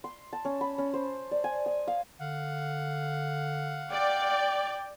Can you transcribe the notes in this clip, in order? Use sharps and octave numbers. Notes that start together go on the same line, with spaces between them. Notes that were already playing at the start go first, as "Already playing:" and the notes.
C6
A5
C#4
B5
C#4
C5
D5
G#5
D#6
F5
D3 F5 F#5
D5 G5